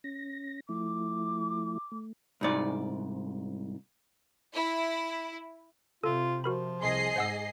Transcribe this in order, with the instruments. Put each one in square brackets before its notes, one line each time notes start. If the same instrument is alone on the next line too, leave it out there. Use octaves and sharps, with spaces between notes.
[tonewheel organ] C#4 A#6
[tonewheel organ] F3 A3 E4 [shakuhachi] D6
[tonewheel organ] A3
[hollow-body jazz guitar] C2 G#2 D5
[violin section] E4
[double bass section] C3 [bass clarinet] F4 [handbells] A4
[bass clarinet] F3 [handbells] F#4 A#4 B5
[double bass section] C2 [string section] G#4 D#5 C7 [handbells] C6
[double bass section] G#2 [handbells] C5 F#5 E6